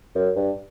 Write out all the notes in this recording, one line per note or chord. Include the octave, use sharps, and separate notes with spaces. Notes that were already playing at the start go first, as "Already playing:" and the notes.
F#2
G2